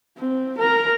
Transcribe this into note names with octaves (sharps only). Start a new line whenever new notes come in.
C4
A#4 A#5